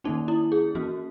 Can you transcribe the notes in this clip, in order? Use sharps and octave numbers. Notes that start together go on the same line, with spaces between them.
D#3 A#3 C#4 D#4
E4
G#4
E3 A#3 C#4 F#4